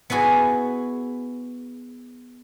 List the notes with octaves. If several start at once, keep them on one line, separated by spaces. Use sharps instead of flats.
B3 E4 F#4 G#4